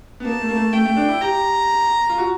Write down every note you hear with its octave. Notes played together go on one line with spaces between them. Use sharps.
B3
A#3 A5
A3
A#3
A3
A3 G5
A3
D4
E4
G4 A#5
F4
F#4